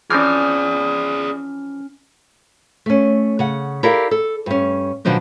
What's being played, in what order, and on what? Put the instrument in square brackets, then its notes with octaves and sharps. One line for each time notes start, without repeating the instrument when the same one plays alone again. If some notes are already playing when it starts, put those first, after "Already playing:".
[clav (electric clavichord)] E3 F3 C4 [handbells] C#4 F6 [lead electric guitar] G#4 D5 [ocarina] D#6
[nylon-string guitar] A3 C#4
C#3 F#5
E4 G4 A4 A#4 D5 F5
A4
G2 C#4
B2 D#3 F3 F#3 C4 D4